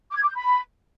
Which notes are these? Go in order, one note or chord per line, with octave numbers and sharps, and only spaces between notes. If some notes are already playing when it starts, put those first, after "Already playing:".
D6
G#6
D6
G6
B5